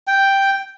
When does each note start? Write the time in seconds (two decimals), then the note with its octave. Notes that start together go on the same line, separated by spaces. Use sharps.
0.07 G5